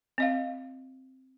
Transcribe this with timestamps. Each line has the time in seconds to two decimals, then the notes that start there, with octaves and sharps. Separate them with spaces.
0.18 C4 D#5 F5